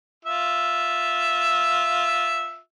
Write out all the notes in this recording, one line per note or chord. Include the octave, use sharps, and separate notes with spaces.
F4 E5